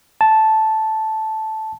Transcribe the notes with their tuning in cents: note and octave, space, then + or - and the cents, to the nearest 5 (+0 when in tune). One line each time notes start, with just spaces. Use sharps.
A5 -5